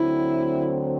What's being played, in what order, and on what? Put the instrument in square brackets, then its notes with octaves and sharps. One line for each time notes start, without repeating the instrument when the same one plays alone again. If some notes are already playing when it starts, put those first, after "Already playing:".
Already playing: [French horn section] D2 D3 F#3 C4 [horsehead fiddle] E4